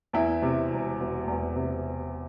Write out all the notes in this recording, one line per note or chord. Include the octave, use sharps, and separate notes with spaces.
E2 E4
C3
E1
E1
E2
C3